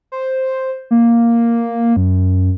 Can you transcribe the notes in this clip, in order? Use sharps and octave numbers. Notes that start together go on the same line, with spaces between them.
C5
A#3
F#2